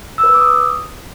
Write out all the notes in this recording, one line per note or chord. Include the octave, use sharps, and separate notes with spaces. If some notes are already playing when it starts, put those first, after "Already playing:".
E6
B4
E6
D6
D#6